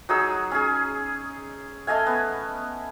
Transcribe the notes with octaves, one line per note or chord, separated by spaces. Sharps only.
F#3 D#4 G#4 E6
C#4 G#4
A3 D#5 F5 G#5
B3